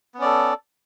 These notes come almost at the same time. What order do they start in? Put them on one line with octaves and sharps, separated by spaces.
B3 C#4 D5 A4